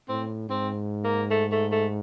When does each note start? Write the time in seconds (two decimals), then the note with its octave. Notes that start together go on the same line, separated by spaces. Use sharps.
0.09 A2 C4
0.49 G#2 C4
1.04 A#3
1.31 A3
1.51 A3
1.71 A3